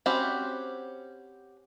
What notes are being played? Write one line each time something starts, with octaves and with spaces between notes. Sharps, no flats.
C4 C#4 F#4 G4 B5